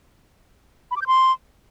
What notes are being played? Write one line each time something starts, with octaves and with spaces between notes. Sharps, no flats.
B5
D6
G6
C6